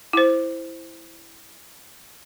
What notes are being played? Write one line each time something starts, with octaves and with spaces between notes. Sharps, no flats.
E4 C5